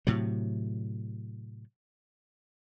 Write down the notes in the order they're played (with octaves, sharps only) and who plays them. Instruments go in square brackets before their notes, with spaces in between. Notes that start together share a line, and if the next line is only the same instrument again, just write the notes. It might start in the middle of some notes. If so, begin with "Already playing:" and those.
[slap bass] A2 C3 F#3